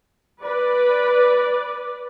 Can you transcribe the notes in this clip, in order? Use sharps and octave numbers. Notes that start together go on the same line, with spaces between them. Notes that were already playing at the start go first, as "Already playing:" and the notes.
B4 D5